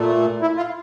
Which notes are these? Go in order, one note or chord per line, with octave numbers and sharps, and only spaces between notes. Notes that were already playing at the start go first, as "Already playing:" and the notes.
Already playing: A#2 A3
E4
F4